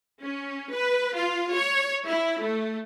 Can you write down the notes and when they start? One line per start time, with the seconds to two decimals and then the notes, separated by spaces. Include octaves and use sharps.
0.22 C#4
0.72 B4
1.15 F4
1.54 C#5
2.08 E4
2.42 A3